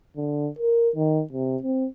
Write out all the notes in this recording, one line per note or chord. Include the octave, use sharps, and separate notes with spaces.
D3
A#4
D#3
C3
C4